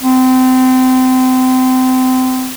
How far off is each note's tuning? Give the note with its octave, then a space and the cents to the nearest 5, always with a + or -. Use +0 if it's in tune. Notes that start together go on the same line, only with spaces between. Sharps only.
C4 -25